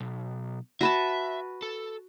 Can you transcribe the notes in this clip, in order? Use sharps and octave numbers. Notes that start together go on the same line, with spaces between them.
B1
F#4 B4 E5 A5
A4